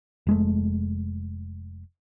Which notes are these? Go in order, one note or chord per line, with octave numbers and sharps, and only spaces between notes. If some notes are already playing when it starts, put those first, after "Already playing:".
F1 G#3 A3